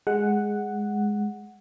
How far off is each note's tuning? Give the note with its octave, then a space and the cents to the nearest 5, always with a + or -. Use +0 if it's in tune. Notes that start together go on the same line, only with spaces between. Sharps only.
G#3 +0 F#5 +0